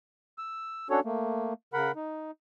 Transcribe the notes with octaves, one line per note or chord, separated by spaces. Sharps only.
E6
C#4 D4 F#4 A4 C#5
A3 A#3
C#3 A#4 F#5 B5
D#4